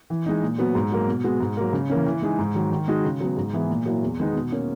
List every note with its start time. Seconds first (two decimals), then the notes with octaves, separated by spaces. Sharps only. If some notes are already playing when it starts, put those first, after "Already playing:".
0.10 E3
0.26 G#3 D#4
0.43 A#2
0.58 F#3 B3 F#4
0.75 G#2
0.91 F#3 A#3
1.08 B2
1.24 G#3 B3 F#4
1.41 G#2
1.57 F#3 A#3
1.73 C#3
1.90 E3 A#3 C#4
2.06 E3
2.22 G#3 D#4 G#4
2.39 G#2
2.55 D#3 F#3
2.72 D#3
2.88 G#3 D#4 F#4
3.04 C#3
3.20 F#3 B3
3.37 G#2
3.53 E3 B3 E4 G#4
3.70 A#2
3.86 F#3 A#3 E4
4.02 E2
4.19 D#3 G#3 B3 D#4
4.35 B2
4.52 A#3 C#4